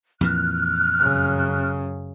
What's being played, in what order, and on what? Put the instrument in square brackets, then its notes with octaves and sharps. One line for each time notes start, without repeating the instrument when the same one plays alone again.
[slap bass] F2 A#2 E3 [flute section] F6 F#6
[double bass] F#2 C#3